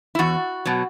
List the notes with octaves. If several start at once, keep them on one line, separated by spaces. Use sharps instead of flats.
E4
E2 F#4
B2 F#3